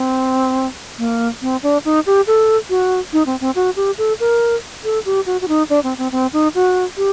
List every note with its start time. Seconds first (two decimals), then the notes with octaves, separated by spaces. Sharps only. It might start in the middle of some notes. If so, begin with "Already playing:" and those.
Already playing: C4
0.98 A#3
1.42 C4
1.63 D4
1.85 D#4
2.06 G4
2.27 A4
2.70 F#4
3.13 D#4
3.26 C4
3.41 C4
3.55 F#4
3.76 G4
3.98 A4
4.20 A#4
4.84 A4
5.06 G4
5.26 F#4
5.41 F#4
5.48 D#4
5.70 D4
5.84 C4
5.98 C4
6.12 C4
6.33 D#4
6.55 F#4
6.97 G4